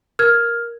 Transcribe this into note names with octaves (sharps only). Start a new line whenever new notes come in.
A#4 F6 G#6